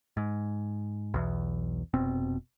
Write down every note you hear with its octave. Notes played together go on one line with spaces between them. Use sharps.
G#2
B1 E2
F1 B2 C4